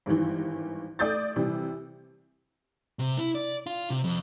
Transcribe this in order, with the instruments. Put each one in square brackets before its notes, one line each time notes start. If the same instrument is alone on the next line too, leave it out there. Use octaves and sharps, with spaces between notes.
[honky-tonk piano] G#1 G2 D#3 E3
A3 D5 D#6 G6 A6
C3 E3 G3
[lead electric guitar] C3
E4
D5
F4
C3
F2